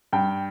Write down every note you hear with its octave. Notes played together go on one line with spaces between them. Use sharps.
G2 G5